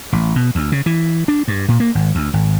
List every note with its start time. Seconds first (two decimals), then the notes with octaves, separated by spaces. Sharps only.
0.13 A1
0.36 B2
0.55 D2
0.72 C#3
0.86 E3
1.28 D4
1.48 G2
1.68 A#2
1.80 A#3
1.95 G#1
2.15 D2
2.34 G#1